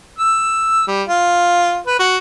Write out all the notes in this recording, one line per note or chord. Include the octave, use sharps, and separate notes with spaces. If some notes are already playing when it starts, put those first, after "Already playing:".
E6
G3
F4
B4
F#4